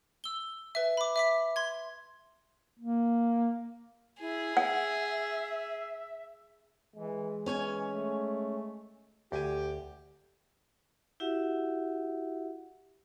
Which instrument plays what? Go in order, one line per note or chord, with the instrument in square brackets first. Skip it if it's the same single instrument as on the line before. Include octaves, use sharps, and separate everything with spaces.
[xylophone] E6 G7
B4 E5
B5 D6
E5 D6 B6
C6 G#6
[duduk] A#3
[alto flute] E4 [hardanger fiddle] G#4
[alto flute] E5 [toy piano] F#5
[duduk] E3 [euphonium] G#3
[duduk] E3 [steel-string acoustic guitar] C#4 C#5 G#5
[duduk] A3
[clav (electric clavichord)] D2 G#5 [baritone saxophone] G4
[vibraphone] E4 F#4 G4 E5 F#5